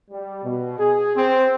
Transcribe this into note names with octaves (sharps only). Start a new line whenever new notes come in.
G3
B2
G#4
C4